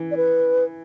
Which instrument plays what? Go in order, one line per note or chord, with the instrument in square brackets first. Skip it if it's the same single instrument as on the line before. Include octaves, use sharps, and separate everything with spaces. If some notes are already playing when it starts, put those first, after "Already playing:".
Already playing: [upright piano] E3
[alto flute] D5
B4